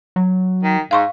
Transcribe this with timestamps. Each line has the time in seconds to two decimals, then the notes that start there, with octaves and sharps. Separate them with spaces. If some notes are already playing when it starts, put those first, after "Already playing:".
0.16 F#3
0.63 D#3
0.91 G#2 F5 C6 C#6